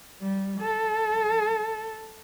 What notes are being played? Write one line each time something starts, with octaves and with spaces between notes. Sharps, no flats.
G3
A4